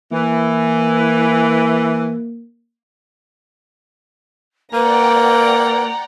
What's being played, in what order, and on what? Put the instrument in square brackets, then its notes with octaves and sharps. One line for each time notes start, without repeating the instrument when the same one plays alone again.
[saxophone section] E3 [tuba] A#3
[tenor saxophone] A#3 [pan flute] B4 [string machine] D5 F#5 G5 [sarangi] A#5